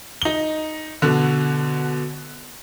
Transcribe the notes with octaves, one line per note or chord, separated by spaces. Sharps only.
D#4 G7
B2 D3